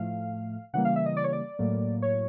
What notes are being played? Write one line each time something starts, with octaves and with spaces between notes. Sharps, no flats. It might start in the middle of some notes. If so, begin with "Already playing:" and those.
Already playing: A2 F3 A3 F5
C#3 E3 G3 A#3 F#5
F5
E5
D#5
D5
C#5
D5
A2 F#3 A#3
C#5